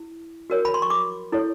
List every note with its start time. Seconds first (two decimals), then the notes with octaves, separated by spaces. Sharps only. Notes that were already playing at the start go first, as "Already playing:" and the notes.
Already playing: E4
0.50 F#4 A#4 C#5
0.65 B5
0.74 C6
0.82 C#6
0.90 D6
1.32 E4 A4 C#5